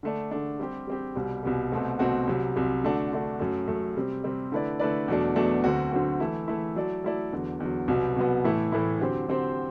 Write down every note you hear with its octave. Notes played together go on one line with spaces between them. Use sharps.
D3 A3 D4
D3 A3 D4
G3 C4 G4
G3 C4 G4
C2 B2 G3
C2 B2 G3
C2 B2 A3 C4 F#4
C2 B2 A3 C4 F#4
C2 C3 F#3
C2 C3 F#3
D3 A3 D4 F#4
D3 A3 D4 F#4
F#2 F#3 A3
F#2 F#3 A3
C3 G3 C4
C3 G3 C4
D3 A3 E4 B4 D5
D3 A3 E4 B4 D5
E2 B2 F#3 A3 D4
E2 B2 F#3 A3 D4
D2 D3 F#3 C4 F#4
D2 D3 F#3 C4 F#4
E3 A3 E4
E3 A3 E4
F#3 A3 E4 A4 D5
F#3 A3 E4 A4 D5
E2 D3 F#3
E2 D3 F#3
C2 B2 F#3 B3
C2 B2 F#3 B3
A2 E3 A3 E4
A2 E3 A3 E4
D3 F#3 C4 G4 C5
D3 F#3 C4 G4 C5